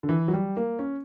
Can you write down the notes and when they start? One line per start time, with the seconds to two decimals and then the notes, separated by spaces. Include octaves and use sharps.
0.03 D3
0.09 E3
0.28 F#3
0.33 G3
0.57 A#3
0.79 C#4